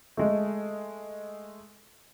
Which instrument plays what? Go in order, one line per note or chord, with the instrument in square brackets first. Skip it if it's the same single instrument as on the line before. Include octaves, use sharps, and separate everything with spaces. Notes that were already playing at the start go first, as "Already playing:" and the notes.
[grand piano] G#3 A3